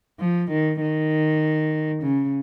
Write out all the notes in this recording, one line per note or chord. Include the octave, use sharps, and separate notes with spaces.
F3
D#3
D#3
C#3